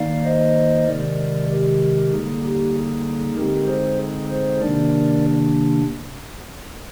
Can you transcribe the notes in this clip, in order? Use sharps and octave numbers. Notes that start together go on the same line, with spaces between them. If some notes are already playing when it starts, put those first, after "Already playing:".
Already playing: D#3 A#3 D#4 D5 F5
C5 D#5
C3 D#3 G#3 A#4 D5
G4 A#4
D3 G3 A#3 D#4 G#4
G4
G#4
D3 G#3 C4 D#4 G4 A#4
G#4 C5
G#4
G#4 C5
C3 D#3 A#3 D4 A#4 D5